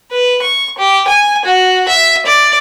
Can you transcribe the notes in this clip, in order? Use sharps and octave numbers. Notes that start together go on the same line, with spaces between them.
B4
C#6
G4
G#5
F#4
E5
D5